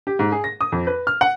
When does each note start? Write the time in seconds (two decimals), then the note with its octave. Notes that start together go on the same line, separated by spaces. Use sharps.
0.07 G4
0.19 G#2
0.32 G#4
0.44 A#6
0.61 D#6
0.72 F2
0.87 B4
1.07 F6
1.21 F#5